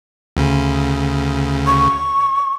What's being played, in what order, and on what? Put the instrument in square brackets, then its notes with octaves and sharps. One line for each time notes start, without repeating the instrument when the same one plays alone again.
[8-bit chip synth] D2 C#3
[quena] C#6